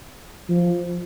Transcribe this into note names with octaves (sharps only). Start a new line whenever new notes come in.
F3